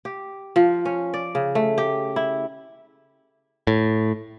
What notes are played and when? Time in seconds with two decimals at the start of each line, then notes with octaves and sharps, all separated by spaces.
0.05 G4
0.56 F3
0.85 C#4
1.14 D5
1.35 C#3
1.55 A3
1.78 G4
2.16 E4
3.67 A2